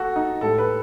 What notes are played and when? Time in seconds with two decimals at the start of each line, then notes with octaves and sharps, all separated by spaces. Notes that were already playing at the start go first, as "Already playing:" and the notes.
Already playing: F#4 A4
0.16 D#4
0.41 A2 G3 A4
0.58 B4